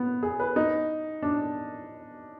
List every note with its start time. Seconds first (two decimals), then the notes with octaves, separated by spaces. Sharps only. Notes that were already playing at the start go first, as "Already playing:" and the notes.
Already playing: B3
0.23 G#4
0.40 B4
0.56 D#4
1.22 D4